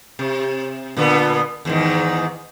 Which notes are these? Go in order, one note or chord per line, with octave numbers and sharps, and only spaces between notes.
C3
A#2 D3 B3
E2 G#2 D#3